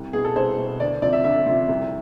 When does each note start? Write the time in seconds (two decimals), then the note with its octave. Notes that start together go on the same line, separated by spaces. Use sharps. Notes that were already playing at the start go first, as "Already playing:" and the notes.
Already playing: C2
0.13 B2 G#4
0.25 A4
0.36 C2 C5
0.58 B2
0.80 D2 D5
1.02 C3 F3 D5
1.13 E5
1.24 D2 E5
1.46 C3 F3
1.69 C2